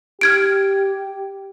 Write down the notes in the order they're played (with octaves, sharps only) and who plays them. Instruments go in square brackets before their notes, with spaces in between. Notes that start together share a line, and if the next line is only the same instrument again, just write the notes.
[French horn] G4 [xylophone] F6 G#6 D7